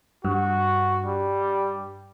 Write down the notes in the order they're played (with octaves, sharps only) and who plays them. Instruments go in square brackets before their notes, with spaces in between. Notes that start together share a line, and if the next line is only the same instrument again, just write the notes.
[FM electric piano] G2 [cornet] F#4
[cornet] G3